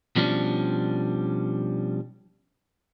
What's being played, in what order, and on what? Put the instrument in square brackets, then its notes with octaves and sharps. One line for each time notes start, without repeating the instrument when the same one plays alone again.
[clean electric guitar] B2 F3 G3 C#4 D4